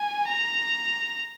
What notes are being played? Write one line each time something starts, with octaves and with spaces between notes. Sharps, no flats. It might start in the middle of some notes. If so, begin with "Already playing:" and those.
Already playing: G#5
A#5